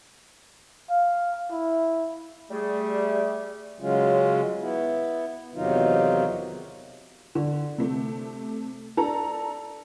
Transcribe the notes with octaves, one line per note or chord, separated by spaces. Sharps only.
F5
E4
G3 A3 G#4
C#3 F#3 G#3 C#4 F4
B3 E4
E2 C3 D#3 F#3 D#4 F4
D3
C3 A3
D4 A4 A#5